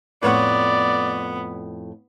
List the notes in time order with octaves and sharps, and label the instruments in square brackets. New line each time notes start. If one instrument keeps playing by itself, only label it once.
[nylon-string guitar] F2 A2 [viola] B3 [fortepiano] B4 C#5 F#5 [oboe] D5